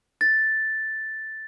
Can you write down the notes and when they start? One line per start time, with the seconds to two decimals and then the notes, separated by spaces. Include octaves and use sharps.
0.21 A6